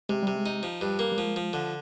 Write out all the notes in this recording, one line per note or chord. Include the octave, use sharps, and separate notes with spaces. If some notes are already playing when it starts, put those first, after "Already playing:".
C3 G#3
C3 G3
G#3
D#4
F3
G2
A#3
G3
F3 G#3
F3
D3